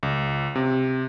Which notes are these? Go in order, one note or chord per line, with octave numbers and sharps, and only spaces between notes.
C#2
C3